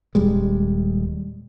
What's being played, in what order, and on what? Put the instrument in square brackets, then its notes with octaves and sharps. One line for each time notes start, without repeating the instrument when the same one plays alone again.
[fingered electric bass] D#1 G3 G#3